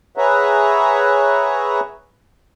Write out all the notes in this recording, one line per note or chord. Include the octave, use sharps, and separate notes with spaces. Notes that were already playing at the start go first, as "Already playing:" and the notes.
G#4 B4 C#5 E5 F#5 A#5